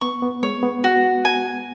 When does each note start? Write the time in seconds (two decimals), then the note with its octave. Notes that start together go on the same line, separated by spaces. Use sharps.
0.01 B3 C#6
0.22 B3
0.43 G#3 C#5
0.63 B3
0.84 F#4
1.25 G#5